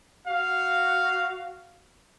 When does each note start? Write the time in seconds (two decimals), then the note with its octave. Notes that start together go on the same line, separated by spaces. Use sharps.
0.27 F#4 F5